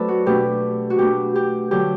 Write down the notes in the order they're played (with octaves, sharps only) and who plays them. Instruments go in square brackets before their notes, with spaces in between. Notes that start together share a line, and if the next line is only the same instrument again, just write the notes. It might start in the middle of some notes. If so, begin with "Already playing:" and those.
Already playing: [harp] F#3 A3 C4 E4 A4 B4 D5
F#4
B2 A3 D4 G4
F#4
B2 A3 D4 G4
G4
D3 F#3 A3 G4